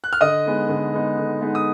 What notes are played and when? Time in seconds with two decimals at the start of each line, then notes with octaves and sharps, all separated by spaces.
0.04 F#6
0.13 F6
0.21 D3 D#5 D#6
0.46 G#3 B3 D#4
0.69 D3
0.93 G#3 B3 D#4
1.18 D3
1.41 G#3 B3 D#4
1.55 D#6